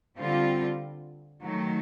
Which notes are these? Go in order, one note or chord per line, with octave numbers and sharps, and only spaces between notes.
D3 G3 C4 F4
D#3 F#3 A3